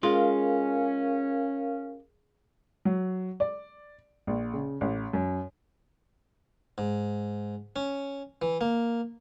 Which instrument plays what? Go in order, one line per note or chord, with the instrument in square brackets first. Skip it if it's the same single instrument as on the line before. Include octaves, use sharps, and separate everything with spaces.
[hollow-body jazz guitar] G#3 F4 [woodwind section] C#4 [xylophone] G#4 [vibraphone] A#4 F5
[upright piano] F#3
D5
A#1
C#3
A1
F#2
[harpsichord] G#2
C#4
E3
A#3